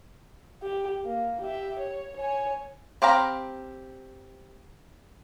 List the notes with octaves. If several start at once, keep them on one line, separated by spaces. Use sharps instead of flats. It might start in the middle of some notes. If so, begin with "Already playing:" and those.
G4
A#3
G4 E5
C#5
C#5 G#5
C4 G4 F5 A#5 B5